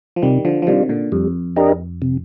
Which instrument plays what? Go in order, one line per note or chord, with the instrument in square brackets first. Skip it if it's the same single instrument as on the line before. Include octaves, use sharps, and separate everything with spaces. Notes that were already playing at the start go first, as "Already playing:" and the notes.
[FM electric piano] F3
[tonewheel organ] C3 [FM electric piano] D#3 G3
[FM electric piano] D3 F3
F3
[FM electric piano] C3 D#3 [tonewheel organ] G3 D4 F4
[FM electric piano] A#2 D3
[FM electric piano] F2 [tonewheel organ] G3
[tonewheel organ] D4 G4 A#4 D#5
C3